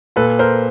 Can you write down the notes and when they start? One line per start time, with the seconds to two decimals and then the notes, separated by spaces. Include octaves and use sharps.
0.16 A#2 A4 B4
0.39 A#4 C5